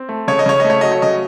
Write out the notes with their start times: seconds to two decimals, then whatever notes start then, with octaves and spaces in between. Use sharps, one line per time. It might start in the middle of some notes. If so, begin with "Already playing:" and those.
Already playing: C4
0.09 A3
0.28 C#3 C#5
0.39 D#5
0.46 C#3 C#5
0.60 A3 D#5
0.70 C#5
0.81 F#3 D#5
0.92 C#5
1.02 C#3 D#5